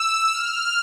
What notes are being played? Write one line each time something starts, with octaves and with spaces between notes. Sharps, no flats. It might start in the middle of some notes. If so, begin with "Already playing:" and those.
Already playing: E6
F6